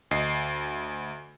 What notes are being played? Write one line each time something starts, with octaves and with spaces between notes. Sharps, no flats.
D2 D#5 C7